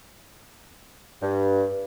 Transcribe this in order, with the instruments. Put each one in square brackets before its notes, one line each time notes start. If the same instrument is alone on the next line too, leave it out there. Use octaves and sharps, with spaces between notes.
[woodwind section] G2